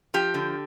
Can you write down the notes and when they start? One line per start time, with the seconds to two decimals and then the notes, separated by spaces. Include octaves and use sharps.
0.14 F3 G4
0.34 D3